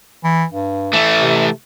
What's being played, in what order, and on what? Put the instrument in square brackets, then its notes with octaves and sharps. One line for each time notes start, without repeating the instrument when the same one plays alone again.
[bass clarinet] E3
G2
[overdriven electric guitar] E3 A3
[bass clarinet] C3